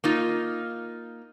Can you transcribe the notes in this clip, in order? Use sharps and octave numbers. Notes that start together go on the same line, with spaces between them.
A#3 D#4 F4